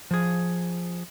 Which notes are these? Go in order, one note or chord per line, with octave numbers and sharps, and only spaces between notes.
F3 G#4